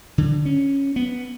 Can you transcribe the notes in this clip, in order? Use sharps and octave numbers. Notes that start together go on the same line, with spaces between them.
D3
C#4
B3